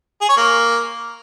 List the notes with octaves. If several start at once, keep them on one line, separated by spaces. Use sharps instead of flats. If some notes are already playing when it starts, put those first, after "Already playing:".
G#4
C#5
A#3